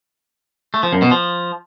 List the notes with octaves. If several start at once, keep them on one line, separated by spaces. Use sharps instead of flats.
A3
F3
F#2
B2
F3